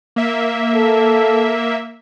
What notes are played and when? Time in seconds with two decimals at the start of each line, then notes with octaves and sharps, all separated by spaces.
0.16 A#3 E5
0.75 A4